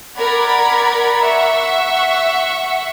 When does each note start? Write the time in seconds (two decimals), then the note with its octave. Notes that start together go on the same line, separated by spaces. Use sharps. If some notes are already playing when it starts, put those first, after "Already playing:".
0.16 A#4 D5 F#5 A#5 B5 G#6
1.21 E5 F#5 C#6